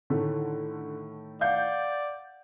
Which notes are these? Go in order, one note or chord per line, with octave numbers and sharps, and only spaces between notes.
A2 D3 D#3 A3
D5 F5 F#5 G6